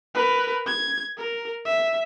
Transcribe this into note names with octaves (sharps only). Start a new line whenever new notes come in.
A#4 B4
G#6
A#4
E5